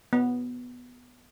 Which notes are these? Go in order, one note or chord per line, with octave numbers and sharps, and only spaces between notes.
B3